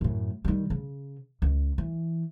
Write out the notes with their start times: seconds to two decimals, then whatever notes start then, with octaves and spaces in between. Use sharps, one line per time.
0.01 F#2 A2
0.45 D#3 G3
0.70 C#3
1.42 C#2
1.78 E3